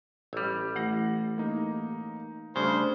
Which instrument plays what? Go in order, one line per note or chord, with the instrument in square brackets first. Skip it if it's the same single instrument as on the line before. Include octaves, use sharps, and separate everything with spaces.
[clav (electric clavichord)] A1 G3 [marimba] E6
[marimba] E3 A3 E4 [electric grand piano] F#5 A#6
[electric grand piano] A#3 D#4
[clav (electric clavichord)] C#3 [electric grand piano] G3 A3 D4 [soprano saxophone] C5 [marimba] G#6